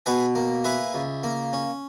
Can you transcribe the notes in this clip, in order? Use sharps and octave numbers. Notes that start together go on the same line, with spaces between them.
B2 G#4 B4
A#3
E4 G#4 B4
C#2
A#3
C#4